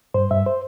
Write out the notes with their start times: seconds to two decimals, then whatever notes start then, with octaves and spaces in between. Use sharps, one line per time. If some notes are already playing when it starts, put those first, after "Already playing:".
0.14 G2 C5
0.31 G2 E5
0.46 C5